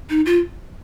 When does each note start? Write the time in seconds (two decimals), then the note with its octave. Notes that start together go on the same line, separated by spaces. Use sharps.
0.10 D#4
0.26 F4